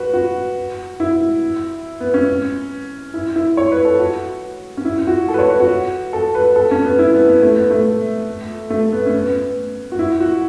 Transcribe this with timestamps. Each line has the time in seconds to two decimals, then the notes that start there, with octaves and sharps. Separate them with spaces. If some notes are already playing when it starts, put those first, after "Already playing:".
Already playing: F#4 B4
0.14 F#4
1.00 E4
2.00 B3
2.14 C#4
3.14 E4
3.36 E4
3.57 C#5
3.72 B4
3.85 A4
3.99 F#4
4.77 C#4
4.85 E4
5.07 F#4
5.29 A4
5.34 B4
5.39 C#5
5.50 B4
5.60 F#4
6.13 A4
6.35 B4
6.56 A4
6.71 C#4
6.84 B3
6.99 E4
7.14 B3
7.28 B3
7.43 A3
7.56 B3
7.70 A3
8.70 A3
8.93 B3
9.06 C#4
9.19 B3
9.92 F#4
9.99 E4
10.20 F#4